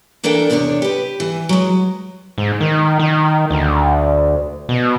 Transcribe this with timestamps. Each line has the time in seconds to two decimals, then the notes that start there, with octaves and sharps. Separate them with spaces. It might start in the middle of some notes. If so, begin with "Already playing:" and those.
0.24 E3 A#3 D4 A4 A#4 G5
0.50 E2 C3 D4 A#4 C#5
0.82 G4 B4
1.20 E3
1.49 F#3 G#3
2.38 G#2
2.60 D#3
3.00 D#3
3.50 D2
4.69 B2